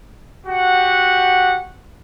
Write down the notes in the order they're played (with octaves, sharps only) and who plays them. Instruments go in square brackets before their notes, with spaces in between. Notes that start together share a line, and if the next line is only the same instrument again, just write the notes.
[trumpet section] F#4 G4 F#5